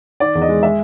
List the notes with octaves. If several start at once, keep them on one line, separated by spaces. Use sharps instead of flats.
D#3 D5
E2
D#5
G#3
G#3 E5